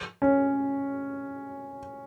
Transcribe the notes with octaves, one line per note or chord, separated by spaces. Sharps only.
C#4